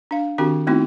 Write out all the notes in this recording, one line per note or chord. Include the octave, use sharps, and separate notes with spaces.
D4 F5
D#3 C4 D4 F#4 G4 A#5
A3 B3 C4 D#4 E4 F#4